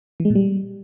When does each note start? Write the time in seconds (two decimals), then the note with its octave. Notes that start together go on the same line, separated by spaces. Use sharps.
0.20 E3
0.25 G#3
0.30 A#2
0.35 G3